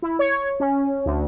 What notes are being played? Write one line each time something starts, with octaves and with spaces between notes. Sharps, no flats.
E4
C#5
C#4
D2